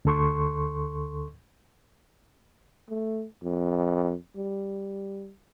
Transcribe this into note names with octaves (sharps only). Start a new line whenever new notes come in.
D2 D3 A4 C6 C#6
A3
F2
G3